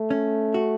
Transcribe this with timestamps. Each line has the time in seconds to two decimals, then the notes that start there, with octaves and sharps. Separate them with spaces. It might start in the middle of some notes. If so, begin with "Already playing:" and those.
Already playing: A3
0.11 C#4
0.54 F#4